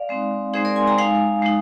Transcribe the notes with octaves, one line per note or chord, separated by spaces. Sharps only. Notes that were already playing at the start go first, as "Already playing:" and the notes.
Already playing: D5 F5
G#3 C4 D#4
G#3 C4 D#4 G#4 C5
A#4 D5
G#5 C6
G5 A#5
G#3 D#4 F5 G#5
G#3 D#4